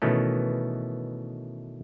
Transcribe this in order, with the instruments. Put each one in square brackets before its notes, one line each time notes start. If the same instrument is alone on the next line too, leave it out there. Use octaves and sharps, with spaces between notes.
[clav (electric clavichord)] B2 D#3 E3 A3 C#4